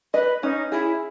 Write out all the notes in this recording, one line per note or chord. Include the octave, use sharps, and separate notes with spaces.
B4 D#5
C#4 D#4
E4 G#4